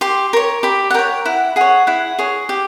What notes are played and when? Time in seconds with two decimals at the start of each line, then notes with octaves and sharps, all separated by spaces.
0.01 G4 C6
0.33 A#4 C#5
0.63 G4 B5
0.90 F#5
0.94 A#4 C#5 G5
1.25 E4 F#5
1.56 G#4 C#5 F#5
1.87 E4 F#5
2.19 G#4 C#5
2.49 G4